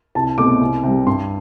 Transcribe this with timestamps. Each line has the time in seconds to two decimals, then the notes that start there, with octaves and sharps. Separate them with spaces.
0.15 C2 A5
0.38 B2 A3 C4 D6
0.61 C2
0.83 C3 G3
1.07 G2 C6